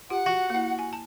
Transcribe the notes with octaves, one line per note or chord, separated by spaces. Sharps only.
F4 G4 F#5
F#4
A#3 E4
G#5
A5